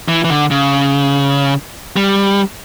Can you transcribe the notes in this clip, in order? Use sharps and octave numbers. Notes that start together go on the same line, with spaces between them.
E3
E3
D3
C#3
G3